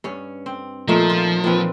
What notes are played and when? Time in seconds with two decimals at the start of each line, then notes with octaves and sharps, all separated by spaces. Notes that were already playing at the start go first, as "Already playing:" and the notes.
0.04 G2 C#4
0.46 C4
0.88 A#2 F3 A3 D#4
1.10 F4
1.44 A#2 C4 B4